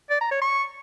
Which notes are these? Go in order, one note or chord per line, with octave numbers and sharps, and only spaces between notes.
D5
A#5
C#5
C#6